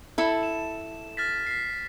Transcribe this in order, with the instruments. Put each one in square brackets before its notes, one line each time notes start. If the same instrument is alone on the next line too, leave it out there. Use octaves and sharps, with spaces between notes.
[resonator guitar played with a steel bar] E4 A4
[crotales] E7
F6 A6 B6
B6 C7